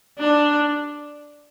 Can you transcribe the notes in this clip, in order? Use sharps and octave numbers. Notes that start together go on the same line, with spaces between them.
D4